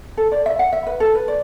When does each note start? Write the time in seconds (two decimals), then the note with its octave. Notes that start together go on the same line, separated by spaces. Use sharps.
0.17 A4
0.32 D5
0.46 E5
0.59 F#5
0.73 E5
0.86 B4
1.00 A4
1.15 B4
1.28 D5